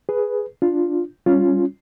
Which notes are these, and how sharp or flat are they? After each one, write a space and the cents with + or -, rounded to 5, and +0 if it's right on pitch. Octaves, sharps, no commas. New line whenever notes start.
G#4 +0 B4 +0
D4 +0 F4 +0
G3 +0 C#4 +0 F4 +0